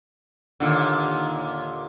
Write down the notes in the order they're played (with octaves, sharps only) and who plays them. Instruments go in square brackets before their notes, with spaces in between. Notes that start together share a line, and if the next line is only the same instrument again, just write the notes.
[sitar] D#2 A#2 D3